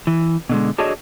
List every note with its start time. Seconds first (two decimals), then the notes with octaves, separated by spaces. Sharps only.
0.07 E3
0.49 B2 D3 G#3
0.78 D4 F#4 G#4 A4 C#5 D#5